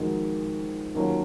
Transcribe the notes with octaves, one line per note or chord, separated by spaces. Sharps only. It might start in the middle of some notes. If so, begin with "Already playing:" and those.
Already playing: F2 D#3 G#3 D#4 F#4
D#2 D#3 F#3 C#4 F4